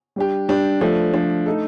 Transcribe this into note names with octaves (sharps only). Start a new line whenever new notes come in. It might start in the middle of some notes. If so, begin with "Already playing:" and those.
G3 D4 G4
G3 D4 G4
F3 A3 D4
F3 A3 D4
A3 D#4 A4